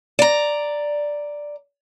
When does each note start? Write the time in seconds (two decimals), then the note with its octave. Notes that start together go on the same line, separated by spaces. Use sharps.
0.19 D5 A#5